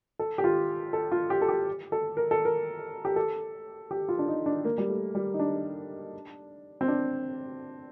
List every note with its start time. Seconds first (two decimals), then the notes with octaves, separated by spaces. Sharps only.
0.19 A4
0.38 G4
0.44 F4
0.93 A4
1.12 F4
1.30 G4
1.42 A4
1.49 G4
1.92 A4
2.17 A#4
2.31 A4
2.45 A#4
3.05 G4
3.16 A4
3.91 G4
4.09 F4
4.19 D4
4.28 D#4
4.46 D4
4.65 A#3
4.78 G3
4.89 A3
5.15 G3
5.34 D#4
5.39 D4
6.81 C4
6.88 D4